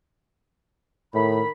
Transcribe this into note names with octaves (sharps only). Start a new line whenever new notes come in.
A2 D#3 B5